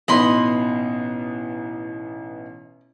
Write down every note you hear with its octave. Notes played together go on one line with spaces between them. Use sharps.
A1 B2 D#4 D#5 B5 C6